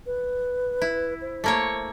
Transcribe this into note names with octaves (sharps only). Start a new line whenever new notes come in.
B4
E4
C5
A3 A#3 C#5